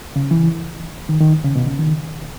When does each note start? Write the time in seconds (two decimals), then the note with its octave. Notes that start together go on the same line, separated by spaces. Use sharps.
0.16 C#3
0.31 E3
1.09 D#3
1.21 D#3
1.44 C#3
1.56 B2
1.67 C#3
1.79 D#3